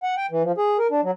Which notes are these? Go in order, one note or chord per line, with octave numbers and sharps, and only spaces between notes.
F#5
G5
E3
F3
G#4
A#4
D4
F#3